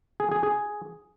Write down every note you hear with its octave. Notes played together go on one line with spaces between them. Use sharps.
G#4
G#4
G#4